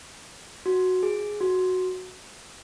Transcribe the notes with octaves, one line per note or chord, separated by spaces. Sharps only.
F#4
G#4
F#4